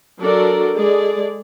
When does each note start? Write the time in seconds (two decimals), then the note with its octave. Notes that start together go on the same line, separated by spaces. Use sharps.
0.21 F#3 D4 F#4 A4 A#4 D5
0.75 G#3 G#4 A4 D5